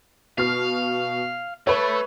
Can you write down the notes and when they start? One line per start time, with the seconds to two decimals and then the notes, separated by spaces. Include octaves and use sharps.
0.38 B2 F5 F6
1.67 A3 B4 C#5